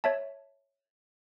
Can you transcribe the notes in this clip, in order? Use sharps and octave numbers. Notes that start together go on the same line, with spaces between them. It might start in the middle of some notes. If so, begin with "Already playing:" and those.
C#5 E5 A5